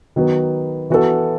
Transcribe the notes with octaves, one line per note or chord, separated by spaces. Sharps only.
D#3 F#3 B3
E3 B3 F#4 A4